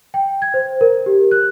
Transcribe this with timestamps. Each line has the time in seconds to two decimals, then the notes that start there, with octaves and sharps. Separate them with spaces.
0.14 G5
0.42 G#6
0.54 C5
0.81 A#4
1.06 G4
1.31 F#6